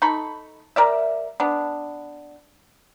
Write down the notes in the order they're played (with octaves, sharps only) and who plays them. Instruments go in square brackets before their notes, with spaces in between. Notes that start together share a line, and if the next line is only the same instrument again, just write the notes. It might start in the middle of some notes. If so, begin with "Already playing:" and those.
[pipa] D#4 A4 B5 C#6
G3 A#4 D5 E5
B3 D4